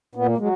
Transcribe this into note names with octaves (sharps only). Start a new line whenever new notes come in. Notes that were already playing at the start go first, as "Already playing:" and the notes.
A#2 B3
A#3
F#3 G#3